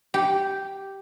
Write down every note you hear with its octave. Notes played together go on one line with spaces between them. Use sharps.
G4